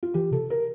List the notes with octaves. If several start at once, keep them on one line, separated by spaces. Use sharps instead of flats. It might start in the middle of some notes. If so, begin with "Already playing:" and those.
F4
E3 G4
C3 A4
A#4